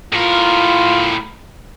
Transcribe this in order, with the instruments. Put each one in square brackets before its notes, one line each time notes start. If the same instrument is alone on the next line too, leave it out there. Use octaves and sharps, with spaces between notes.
[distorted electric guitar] A2 A#4 [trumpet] F4